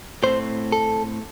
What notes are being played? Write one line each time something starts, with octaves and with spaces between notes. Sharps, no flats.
A2 A3 C4 C5
A4